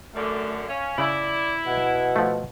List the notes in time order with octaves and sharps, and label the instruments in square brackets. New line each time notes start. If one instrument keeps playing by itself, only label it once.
[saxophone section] F#2 D3 [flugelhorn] A3
[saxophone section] C#4 [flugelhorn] F5
[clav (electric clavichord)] C#3 [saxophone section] E4 [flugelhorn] D5
[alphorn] B2 [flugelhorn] F#5
[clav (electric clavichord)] F3 A3